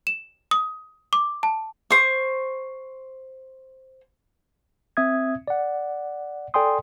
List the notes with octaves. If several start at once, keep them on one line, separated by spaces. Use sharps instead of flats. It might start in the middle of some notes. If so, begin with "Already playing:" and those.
E7
D#6
D6
A5
C5 C#6
C4 E5 D#6 G#6
D5 F#5
A4 D5 G5 G#5 C6 D#6